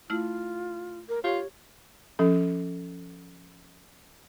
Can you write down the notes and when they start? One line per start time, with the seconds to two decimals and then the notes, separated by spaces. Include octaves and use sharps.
0.10 A3 E4 F4 F6
1.09 A#4
1.24 F4 G4 C#5
2.19 F3 C#4 A4